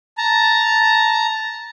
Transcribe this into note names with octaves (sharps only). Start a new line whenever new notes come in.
A5 A#5